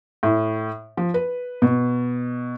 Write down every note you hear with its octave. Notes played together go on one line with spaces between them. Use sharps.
A2
F3
B4
B2